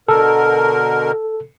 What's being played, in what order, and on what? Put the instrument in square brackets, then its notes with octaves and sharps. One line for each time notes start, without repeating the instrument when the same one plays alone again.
[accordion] B2 D3 A#4 [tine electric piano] A4